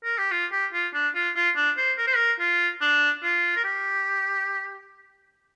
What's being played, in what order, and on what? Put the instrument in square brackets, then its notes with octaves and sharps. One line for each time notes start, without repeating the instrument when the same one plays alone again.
[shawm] A#4
G4
F4
G4
F4
D4
F4
F4
D4
C5
A#4
C5
A#4
F4
D4
F4
A#4
G4